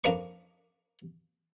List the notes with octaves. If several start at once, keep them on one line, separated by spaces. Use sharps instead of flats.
F2 A#3 D4 B4 C#6